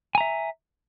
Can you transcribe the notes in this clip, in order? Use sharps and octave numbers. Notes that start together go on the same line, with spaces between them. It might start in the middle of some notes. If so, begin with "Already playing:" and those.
E5 G#5 A#5